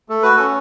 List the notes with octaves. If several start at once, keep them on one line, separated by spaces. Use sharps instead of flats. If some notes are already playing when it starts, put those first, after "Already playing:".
A3 A4
F#4 B4
C#4 A4